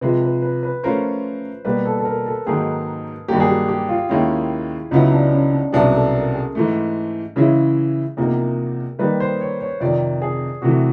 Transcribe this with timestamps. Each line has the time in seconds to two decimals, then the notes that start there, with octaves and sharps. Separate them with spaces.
0.01 C3 F3 G#3 B4
0.22 B4
0.42 B4
0.63 B4
0.83 F3 A3 C#4 F4 A#4 C5
1.65 B2 G3 A#3 B4
1.86 A4
1.99 A4
2.05 A#4
2.26 A4
2.47 G#2 D#3 F#3 A#3 G#4
3.28 G2 D#3 F#3 A#3 G4
3.40 G#4
3.49 G4
3.68 G4
3.89 F4
4.09 D#2 D#3 G#3 C#4 E4
4.91 C#2 C#3 F#3 B3 D#4 E4
5.12 D4
5.32 C#4
5.52 D4
5.72 C2 B2 F#3 B3 D4 G#4
5.94 A4
6.14 A#4
6.34 G#4
6.55 G#2 E3 A3 A4
7.36 C#3 E3 G#3 C#4 E4
8.17 E2 C3 F3 A#3 D#4 A#4
8.99 D#3 G3 A#3 D#4 B4
9.20 C5
9.41 C#5
9.60 C#5
9.80 F2 C3 D#3 D5
10.22 G#4
10.62 C3 E3 A3 F#4